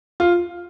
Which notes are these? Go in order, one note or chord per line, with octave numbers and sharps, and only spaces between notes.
F4